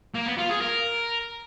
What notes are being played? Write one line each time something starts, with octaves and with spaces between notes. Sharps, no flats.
A#3
B3
F4
G#4
A#4